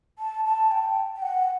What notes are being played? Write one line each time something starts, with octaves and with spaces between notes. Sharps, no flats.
A5
A5
G5
G5
F#5